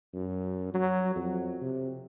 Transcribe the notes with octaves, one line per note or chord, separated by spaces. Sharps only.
F#2
F#3
F2
C3